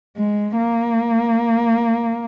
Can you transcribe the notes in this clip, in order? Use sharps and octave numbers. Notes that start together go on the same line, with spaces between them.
G#3
A#3